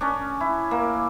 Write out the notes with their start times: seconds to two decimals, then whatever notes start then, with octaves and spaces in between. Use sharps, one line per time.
0.01 C#4 D4
0.41 E4
0.71 A#3